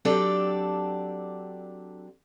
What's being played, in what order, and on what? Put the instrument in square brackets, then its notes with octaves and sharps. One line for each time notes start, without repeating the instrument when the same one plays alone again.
[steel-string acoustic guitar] F#3 C4 D4 G4 A4 D5